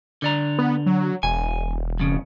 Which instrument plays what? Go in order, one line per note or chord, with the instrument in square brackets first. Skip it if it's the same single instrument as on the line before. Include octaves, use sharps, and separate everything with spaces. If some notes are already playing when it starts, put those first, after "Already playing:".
[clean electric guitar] D3 D5 A#5
[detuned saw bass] B3
F#3
[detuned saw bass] E1 [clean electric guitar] G#5
[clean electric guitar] F2 C#3